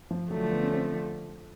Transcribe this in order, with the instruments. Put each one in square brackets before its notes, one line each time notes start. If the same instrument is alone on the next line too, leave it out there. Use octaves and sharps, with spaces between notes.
[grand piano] F3
[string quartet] D3 F3 A3 [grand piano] F#3
[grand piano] B3
C#4
C4